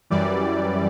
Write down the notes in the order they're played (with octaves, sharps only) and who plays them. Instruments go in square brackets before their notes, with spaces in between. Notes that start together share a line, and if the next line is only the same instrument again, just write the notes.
[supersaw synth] F#2 E3 G3 D5